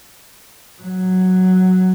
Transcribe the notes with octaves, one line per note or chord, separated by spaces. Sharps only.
F#3